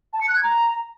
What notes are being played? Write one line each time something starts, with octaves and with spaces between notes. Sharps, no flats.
A5
C#7
F#6
G#6
A#5